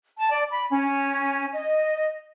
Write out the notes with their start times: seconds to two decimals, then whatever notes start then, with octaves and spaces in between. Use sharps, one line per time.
0.18 A5
0.30 D5
0.50 B5
0.71 C#4
1.52 D#5